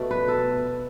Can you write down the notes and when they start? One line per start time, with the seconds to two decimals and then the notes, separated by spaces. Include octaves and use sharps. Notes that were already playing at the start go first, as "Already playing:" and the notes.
Already playing: B2 A3 D5
0.11 B4
0.28 A4